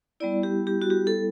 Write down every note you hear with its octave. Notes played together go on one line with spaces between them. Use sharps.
G3 B3 E4 D5
G4
G4
F#4
G4
A4